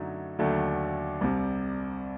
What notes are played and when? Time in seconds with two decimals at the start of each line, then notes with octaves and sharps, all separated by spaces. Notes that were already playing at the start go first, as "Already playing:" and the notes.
Already playing: F#2 D3 F#3 A3 D#4
0.39 D#2 D3 F#3 A3
1.21 C2 C3 G3